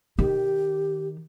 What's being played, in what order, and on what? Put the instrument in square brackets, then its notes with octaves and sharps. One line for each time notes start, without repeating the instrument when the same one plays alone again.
[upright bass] D#3 [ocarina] G4